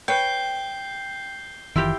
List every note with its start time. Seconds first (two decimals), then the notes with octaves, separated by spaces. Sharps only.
0.08 B4 C#5 G5 G6 C7 G7
1.76 F#1 D#3 E3 E4 F4 G4